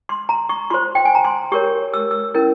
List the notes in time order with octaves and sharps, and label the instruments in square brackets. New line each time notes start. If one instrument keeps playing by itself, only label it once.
[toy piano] C6
A#5
C#6
F4 C5 C6
G5
G#5
A#5
C6
G4 A#4 C#5 C#6
E6
E6
C#4 E4 A#4